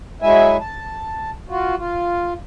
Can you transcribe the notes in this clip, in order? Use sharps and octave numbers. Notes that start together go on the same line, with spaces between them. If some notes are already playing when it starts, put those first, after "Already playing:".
F#3 G#3 E4 E5 G#5
A5
F4 F#4
F4